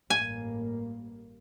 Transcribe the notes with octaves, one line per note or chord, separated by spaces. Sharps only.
A1 G2 A#3 G#5